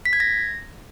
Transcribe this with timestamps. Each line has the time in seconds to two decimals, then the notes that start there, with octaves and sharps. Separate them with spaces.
0.05 B6
0.13 G#6
0.20 A#6